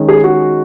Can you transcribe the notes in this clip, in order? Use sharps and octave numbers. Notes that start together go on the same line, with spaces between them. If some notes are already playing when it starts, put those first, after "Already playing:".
Already playing: D#3 G#3 C#4
G#4
F#4